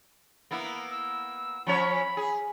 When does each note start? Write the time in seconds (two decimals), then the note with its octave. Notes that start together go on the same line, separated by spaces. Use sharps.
0.51 A#3 B3 E4
0.90 E6
1.67 F3 C#4 C#5 B5
2.17 G#4